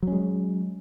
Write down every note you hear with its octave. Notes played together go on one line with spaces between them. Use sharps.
F#3 G#3 C#4